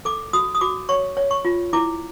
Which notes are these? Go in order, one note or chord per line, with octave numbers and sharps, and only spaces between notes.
A4 D6
F#4 D#6
D#6
F#4 D6
C#5 C#6
C#5
C#6
F4
E4 D6